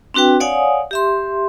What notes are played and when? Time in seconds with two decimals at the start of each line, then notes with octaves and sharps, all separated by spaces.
0.14 C4 D4 F#4 B4 G5
0.40 C#5 D5 F5 F#5 G#5 D#6
0.91 G4 E5 C6